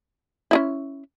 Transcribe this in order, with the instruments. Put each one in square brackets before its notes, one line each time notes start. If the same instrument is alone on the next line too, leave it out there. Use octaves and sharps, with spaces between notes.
[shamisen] C#4 D#4 E4